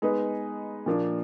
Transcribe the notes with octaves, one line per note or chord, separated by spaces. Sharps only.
G#3 B3 D#4 G#4 B4
A#2 F3 A#3 D4